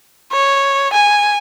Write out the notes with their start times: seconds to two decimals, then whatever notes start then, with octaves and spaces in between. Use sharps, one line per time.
0.32 C#5
0.93 G#5